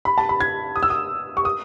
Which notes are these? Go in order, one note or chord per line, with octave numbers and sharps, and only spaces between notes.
B5
A5
B5
G#6
D#6
E6
D#6
C#6
D#6